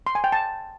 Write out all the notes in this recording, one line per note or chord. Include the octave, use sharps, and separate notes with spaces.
C6
G#5
G5
A5